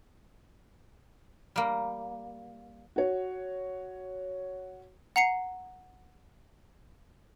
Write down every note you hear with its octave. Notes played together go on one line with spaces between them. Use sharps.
G3 A#3
F#4 C#5
F#5 A#5 C7 C#7